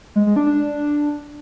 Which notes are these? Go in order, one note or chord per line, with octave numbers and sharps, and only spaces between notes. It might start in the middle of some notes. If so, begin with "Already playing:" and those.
G#3
G#3
D4
D4